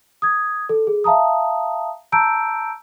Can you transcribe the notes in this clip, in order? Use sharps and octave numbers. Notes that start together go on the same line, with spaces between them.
D#6 G#6
A4
G#4
E5 F5 A5 A#5 D#6
A5 A#5 E6 G6 D7